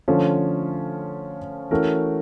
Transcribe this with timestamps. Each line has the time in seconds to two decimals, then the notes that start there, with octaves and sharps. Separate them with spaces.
0.08 D3 F3 A3 C#4 F4
1.71 E3 A3 C#4 F#4 A#4